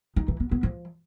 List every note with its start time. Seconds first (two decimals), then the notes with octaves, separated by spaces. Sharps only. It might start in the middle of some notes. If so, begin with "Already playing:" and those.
0.16 D#4
0.28 E3
0.40 B3
0.51 B3
0.63 F3